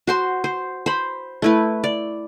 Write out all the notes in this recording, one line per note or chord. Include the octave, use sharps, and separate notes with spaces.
F#4 C5 C6
C5
C5 B5
A3 E4 B4
D5